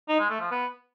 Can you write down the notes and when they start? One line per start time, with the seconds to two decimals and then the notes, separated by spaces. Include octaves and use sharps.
0.08 D#4
0.19 G#3
0.30 A3
0.40 F3
0.51 B3